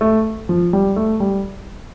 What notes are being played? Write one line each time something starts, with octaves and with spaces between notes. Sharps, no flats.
A3
F3
G3
A3
G3